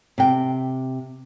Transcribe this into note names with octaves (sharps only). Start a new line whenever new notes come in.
C3 G5